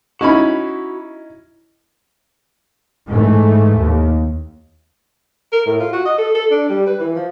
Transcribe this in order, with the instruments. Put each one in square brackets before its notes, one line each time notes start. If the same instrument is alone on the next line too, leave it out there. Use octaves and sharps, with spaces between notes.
[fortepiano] C#4 D#4 E4 [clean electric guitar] F#4 B5
[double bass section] G#2 E3 A3
D#2
[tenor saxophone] A#4
A2
F4
F#4
D#5
A4
A4
D4
G3
B4
E3
F3